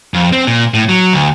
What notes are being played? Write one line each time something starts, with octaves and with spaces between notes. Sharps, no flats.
F2
C4
A#2
A2
F#3
D2